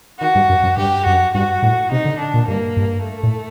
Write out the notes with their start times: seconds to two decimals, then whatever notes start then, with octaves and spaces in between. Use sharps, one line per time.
0.20 D#3 F#4
0.35 G2
0.50 F#2
0.63 F#2
0.77 G2 G4
1.06 F#2 F#4
1.34 G2 F#4
1.62 A2
1.92 C3 D#4
2.05 D3
2.19 D4
2.34 A#2
2.47 G2 A#3
2.77 G2
3.04 A3
3.23 A2